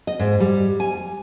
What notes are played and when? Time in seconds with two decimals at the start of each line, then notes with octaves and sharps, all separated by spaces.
0.07 D#5
0.19 G#2
0.40 G3
0.80 G#5